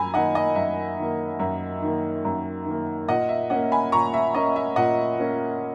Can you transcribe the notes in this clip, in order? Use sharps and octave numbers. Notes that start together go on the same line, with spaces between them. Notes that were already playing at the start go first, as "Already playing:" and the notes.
Already playing: F#2 G#5 A#5 B5
D#3 A#3 D#5 F#5
D#5
F#2 E5
D#3 A#3
F#2 E5
D#3 A#3
F#2
D#3 A#3
A#2 D#5 F#5
E5
A#3 C#4 D#5 F#5
G#5 B5
A#2 A#5 C#6
E5
A#3 C#4 D#5
E5
A#2 D#5 F#5
A#3 C#4